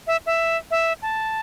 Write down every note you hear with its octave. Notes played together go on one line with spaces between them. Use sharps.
E5
E5
E5
A5